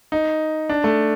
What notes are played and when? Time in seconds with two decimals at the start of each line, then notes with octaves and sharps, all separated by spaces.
0.12 D#4
0.69 D4
0.84 A3